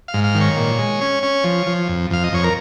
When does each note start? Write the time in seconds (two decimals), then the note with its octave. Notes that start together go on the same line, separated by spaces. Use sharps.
0.08 F5
0.14 G#2
0.24 F5
0.35 D#3
0.41 C#5
0.57 A#2
0.78 G#3
1.01 C#4
1.23 C#4
1.44 F3
1.66 F3
1.89 F2
2.10 F2 F5
2.24 D#5
2.33 F2 C#5
2.44 A#4